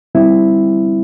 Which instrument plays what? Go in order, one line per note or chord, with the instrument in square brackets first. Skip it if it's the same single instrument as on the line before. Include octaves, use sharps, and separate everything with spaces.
[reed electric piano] D3 G3 C4 E4